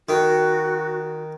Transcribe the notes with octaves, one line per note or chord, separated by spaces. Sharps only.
D#3 F#4